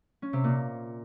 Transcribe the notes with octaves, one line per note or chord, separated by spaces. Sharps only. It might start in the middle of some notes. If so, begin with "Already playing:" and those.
C#4
C3
A#2